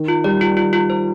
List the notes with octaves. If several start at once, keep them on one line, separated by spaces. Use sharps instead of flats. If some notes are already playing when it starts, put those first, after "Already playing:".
Already playing: D#3
F4
G3 D5
F4
F4
F4
C5